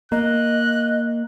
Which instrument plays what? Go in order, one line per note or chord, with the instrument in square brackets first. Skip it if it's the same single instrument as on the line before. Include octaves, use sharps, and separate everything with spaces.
[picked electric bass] A#3 [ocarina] D#5 [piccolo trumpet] F#6